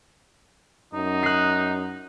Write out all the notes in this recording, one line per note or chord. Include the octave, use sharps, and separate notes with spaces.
F#2 D#4
F#6 C7